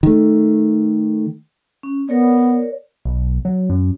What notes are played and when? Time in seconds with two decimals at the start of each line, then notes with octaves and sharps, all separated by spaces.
0.03 D#3 A3
1.83 C#4
2.09 B3 A#4 C#5 D5
3.05 B1
3.45 F#3
3.70 F#2